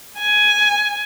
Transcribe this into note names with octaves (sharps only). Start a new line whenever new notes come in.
G#5